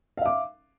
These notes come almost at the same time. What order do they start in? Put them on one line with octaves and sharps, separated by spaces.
F5 E5 D6